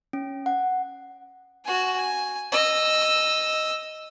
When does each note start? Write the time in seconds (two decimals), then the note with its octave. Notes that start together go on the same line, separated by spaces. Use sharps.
0.13 C#4
0.46 F#5
1.65 F#4 G#5
1.97 G#5
2.52 D#5 E6